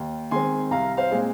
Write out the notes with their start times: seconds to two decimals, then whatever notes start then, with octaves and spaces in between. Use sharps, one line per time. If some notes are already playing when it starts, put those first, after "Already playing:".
Already playing: D#2
0.31 D#3 G#3 C4 G#5 C6
0.71 C2 F5 A#5
0.97 C5 F5
1.11 A#2 G#3 C4